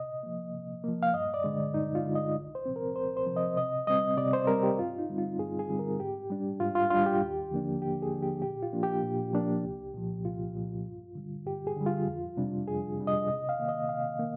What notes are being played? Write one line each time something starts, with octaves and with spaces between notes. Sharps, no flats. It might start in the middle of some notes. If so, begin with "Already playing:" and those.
Already playing: C3 D#5
F3 A#3
C3
F3 A#3
F5
G2 D#5
D5
D3 G#3
G2 D#4
F4
D3 G#3
D#5
C2
C5
C3 F3 C4
A#4
C2 C5
C5
C3 F3 C4
D#5
C3 D#5
G3 C4 D#5
C3 D5
C5
G3 C4 A#4
G4
G2 F4
D#4
D3 G3 C4
F4
G2 G#4
G#4
D3 G3 C4
A#4
G#2 G4
G3 D4
G#2 F4
F4
G3 D4 F4
G4
D#2
D3 F3 A#3 D4
D#2 G4
G#4
D3 F3 A#3 D4
G4
A#2 G4
F4
F3 A#3 D4
G4
A#2
F3 A#3 D4
C2
A#2 F3
C2 F4
A#2 F3
G2
D3 G3
G2 G4
G#4
D3 G3
F4
F2
C3 G3 D4
F2 G#4
C3 G3 D4
D#5
C3 D#5
F5
D#3 A#3
D#5
C3 F5
D#3 A#3